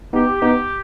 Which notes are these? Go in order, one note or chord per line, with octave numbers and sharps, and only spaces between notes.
B3 D#4 G4
B3 D#4 G4